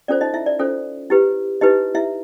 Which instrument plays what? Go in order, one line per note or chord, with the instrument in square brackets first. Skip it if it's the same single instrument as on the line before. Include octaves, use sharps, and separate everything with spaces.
[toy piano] C#4 F4 A4 C5 D5
D#4 D#5
E4 E5
D5
C#4 F4 A4 C5
E4 G4 B4
D#4 E4 G4 B4 D#5
E4 E5